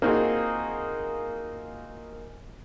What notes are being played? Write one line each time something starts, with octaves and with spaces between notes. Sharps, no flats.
A#3 C4 D#4 F4 F#4 G#4